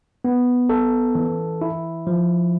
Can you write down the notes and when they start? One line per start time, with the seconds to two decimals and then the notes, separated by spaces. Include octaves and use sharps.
0.25 B3
0.69 A4
1.15 E3
1.61 E4
2.07 F3